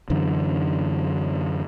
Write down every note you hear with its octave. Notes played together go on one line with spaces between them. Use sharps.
F#2 D3 E3